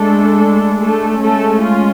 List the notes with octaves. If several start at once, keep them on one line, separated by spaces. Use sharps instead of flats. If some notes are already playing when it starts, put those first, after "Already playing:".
Already playing: G#3 A3 D4 A4
A3 A4
G#3 A3 C#4 A4
F4